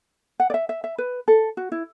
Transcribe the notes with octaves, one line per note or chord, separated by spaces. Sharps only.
F#5
D5
E5
E5
E5
B4
A4
F#4
E4